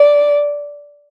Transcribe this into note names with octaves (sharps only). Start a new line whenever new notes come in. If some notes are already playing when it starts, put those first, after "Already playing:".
Already playing: D5